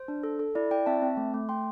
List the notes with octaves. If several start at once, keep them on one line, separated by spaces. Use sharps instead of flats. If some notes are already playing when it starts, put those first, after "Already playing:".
Already playing: C5
D4
A4
A4
E4 D5
E4 D5 G5
C4 E5 A5
C4
A3
A3
A3 G5 C6